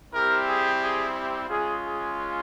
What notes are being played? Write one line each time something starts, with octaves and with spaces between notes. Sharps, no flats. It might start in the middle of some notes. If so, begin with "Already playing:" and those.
G3 C4 E4 G4 A#4
G#4
G#4
G4
G#3 C#4 F4 G#4
G#4